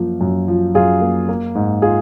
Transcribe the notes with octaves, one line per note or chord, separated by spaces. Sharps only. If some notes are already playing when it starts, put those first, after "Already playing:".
Already playing: F#2 F3 A#3
F#2
F3
F#2 F4 G#4
A#3
A#3
G#2
F4 G#4